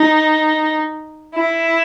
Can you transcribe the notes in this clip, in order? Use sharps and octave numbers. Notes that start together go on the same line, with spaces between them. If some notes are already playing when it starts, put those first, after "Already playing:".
Already playing: D#4
E4